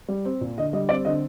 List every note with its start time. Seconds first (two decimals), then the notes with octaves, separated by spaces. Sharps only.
0.08 G3
0.25 C4
0.41 A#2
0.58 D3 D#5
0.73 G3 D#5
0.89 C4 D5
1.05 D3 D#5